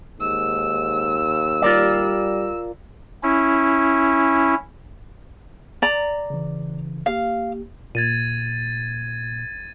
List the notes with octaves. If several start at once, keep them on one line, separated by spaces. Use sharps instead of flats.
D#2 G#2 E6
G3 F4 A#4 D5
C#4 E4
D5 A#5
C#3 E3
A#3 G4 F5
A#2 G#6 A6 D#7